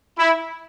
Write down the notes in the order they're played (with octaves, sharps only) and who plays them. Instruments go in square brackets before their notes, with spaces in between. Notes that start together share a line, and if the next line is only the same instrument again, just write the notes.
[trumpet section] E4